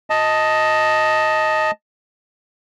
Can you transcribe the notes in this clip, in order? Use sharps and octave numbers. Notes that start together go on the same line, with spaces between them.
D#5 A5